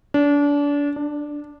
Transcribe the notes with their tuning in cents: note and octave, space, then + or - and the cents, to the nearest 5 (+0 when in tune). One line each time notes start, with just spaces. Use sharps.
D4 -30
D4 +5